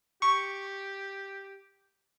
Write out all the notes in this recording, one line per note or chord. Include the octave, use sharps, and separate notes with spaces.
G4 C#6